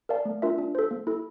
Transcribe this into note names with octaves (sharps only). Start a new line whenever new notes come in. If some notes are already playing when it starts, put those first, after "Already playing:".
A#4 D5 F5 A5
A3
D4 F4 A#4 E5
D4
A4 C5
A#3
E4 A4